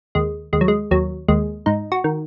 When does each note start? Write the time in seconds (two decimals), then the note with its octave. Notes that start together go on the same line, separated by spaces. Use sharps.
0.15 D#2 G#3
0.53 D#2 G#3
0.61 F#3
0.68 G#3
0.91 D#2 F#3
1.28 D#2 G#3
1.66 G#2 D#4
1.92 F#4
2.04 D#3